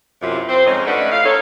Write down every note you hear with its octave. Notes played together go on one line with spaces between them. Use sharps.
F#2 C3 E4 F4
C4 C5
F2 G#2 C#4 D#4 C#5
A3 C#4 D4 B4 D#5 F#5
F5
D#4 A4 C#5